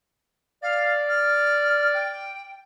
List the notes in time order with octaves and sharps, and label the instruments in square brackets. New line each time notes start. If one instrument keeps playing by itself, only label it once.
[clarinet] D5 [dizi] F5
[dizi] F6
G5